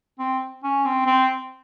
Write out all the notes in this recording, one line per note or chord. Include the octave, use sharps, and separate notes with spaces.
C4
C#4
C4
C4